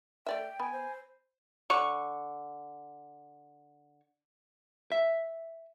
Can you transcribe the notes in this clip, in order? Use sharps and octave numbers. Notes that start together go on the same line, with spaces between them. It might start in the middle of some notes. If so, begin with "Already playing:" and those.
A3 D5 E5 G5
B3 G#5 B5
C5
D3 C#6
E5